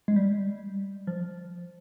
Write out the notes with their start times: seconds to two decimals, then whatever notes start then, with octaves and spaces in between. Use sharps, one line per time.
0.08 G#3
0.16 G3
1.07 F3